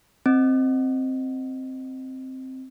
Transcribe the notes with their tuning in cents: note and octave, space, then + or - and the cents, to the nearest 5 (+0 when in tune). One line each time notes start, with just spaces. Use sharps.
C4 +0 D#5 +0